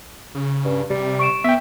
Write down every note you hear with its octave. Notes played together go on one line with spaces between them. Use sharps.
C#3
G2
C3 G3
C#6 D7 E7
B3 E5 G5